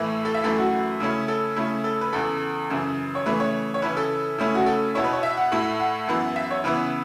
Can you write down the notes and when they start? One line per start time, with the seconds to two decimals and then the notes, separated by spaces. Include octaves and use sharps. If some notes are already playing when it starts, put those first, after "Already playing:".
Already playing: A2 E3 A3 E4
0.25 A4
0.35 E5
0.44 F#2 E3 A3 E4 A4
0.58 F#4
1.00 C#3 A3 C#4 E4
1.28 A4
1.56 C#3 A3 C#4 E4
1.84 A4
2.01 B4
2.13 E2 C#3 E3 A4
2.70 F#2 C#3 E3
3.15 C#5
3.26 C#3 E3 A3 B4
3.40 C#5
3.74 C#5
3.82 C#3 E3 C#4 E4 B4
3.97 A4
4.38 C#3 A3 C#4 E4
4.55 F#4
4.66 A4
4.95 B2 B3 E4 C#5
5.04 B4
5.13 C#5
5.23 E5
5.37 F#5
5.52 A2 A3 E4
5.80 F#5
6.07 F#2 E3 B3 E4
6.36 E5
6.51 C#5
6.64 C#3 E3 B3 E4 B4